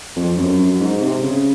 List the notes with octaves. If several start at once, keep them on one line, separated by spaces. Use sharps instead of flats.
F2
F#2
F#2
G#2
C3
C#3